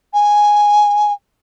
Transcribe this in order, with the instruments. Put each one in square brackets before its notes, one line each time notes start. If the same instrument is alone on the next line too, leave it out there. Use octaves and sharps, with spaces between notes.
[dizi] G#5